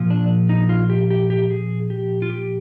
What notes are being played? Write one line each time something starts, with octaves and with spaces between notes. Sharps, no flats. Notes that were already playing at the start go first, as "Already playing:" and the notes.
Already playing: A#2 F3
D4
D#4
F4
G4
G4
G4
G#4
G4
F4
G4